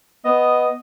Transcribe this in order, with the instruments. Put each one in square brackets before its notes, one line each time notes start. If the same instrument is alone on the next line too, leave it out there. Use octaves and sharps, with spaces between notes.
[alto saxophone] B3 [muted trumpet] D#5